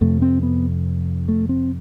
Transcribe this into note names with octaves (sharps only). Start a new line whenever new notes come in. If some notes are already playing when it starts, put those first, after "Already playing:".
F2 C3 A3
C4
B3
A3
C4